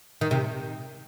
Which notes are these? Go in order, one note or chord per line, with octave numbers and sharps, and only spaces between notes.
D#3
C3